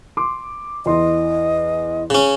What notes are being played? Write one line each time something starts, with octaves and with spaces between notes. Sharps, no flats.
C6 D6
E2 D#5 C6
C#3 C#4